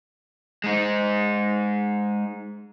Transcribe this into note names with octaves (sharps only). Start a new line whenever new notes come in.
G#3 D#4